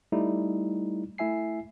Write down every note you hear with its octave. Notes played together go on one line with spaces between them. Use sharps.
G3 A3 D#4 E4
A3 E4 E5 G#5 C7